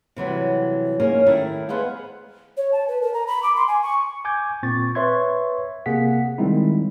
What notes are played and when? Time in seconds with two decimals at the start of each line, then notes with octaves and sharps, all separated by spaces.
0.16 C3 E3 F#3 G3
1.00 A#3 C#4 D#4 G#4 C#5
1.26 D#3 G3 A3 E4 A#4
1.69 B3 G#4 B4 C5 D#5 F5
2.57 C#5
2.72 A5
2.88 B4
3.02 A#4
3.14 A#5
3.27 B5
3.43 D6
3.56 C6
3.68 G#5
3.83 C#6
4.25 G#5 D6 G6 G#6
4.63 A#2 C4 C#6 A6
4.95 B4 C#5 E5 C6 C#6 G#6
5.86 C3 A#3 G#4 F#5 B6
6.38 D#3 G3 G#3 C4 D#4 E4